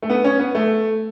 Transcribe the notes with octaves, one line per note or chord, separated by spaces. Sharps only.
A3
B3
C#4
B3
A3